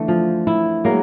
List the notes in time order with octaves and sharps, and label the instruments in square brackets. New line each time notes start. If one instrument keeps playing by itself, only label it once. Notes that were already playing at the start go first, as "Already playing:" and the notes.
Already playing: [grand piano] D3 E3 [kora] A3
[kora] F3
E4
[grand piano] F#3 G#3 [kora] A#3